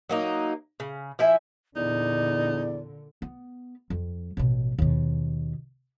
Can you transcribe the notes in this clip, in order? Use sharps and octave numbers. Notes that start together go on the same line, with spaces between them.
F#3 A#3 D#4
C#3
F3 E4 E5 G#5
E2 A#2 D3 D#4 D5
B3
F2
A1 B2
D#2 B2